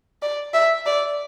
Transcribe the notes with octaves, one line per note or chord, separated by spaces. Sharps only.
D5
E5
D5